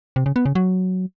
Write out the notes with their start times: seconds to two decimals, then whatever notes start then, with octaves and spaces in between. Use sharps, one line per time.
0.16 C3
0.26 C#3
0.36 B3
0.46 C#3
0.55 F#3